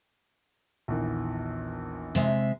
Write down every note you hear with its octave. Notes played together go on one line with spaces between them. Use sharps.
A#1 E2 D#3
C3 G#3 E5